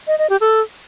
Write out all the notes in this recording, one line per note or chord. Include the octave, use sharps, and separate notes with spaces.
D#5
D#5
G4
A4